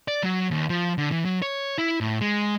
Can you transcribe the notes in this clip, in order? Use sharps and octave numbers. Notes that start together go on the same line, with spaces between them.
D5
F#3
D#2
F3
D3
E3
F#3
C#5
E4
A2
G#3